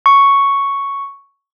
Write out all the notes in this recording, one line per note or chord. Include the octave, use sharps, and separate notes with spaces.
C#6